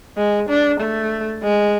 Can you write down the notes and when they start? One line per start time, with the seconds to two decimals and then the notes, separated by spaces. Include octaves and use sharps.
0.17 G#3
0.49 D4
0.80 A3
1.43 G#3